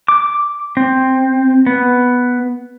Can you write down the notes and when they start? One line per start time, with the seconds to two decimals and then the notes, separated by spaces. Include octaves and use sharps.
0.08 D6
0.77 C4
1.66 B3